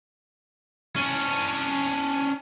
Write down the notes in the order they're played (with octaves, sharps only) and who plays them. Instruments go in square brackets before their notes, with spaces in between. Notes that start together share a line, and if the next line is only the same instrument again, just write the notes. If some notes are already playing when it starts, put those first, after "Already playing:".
[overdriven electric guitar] C#4 D4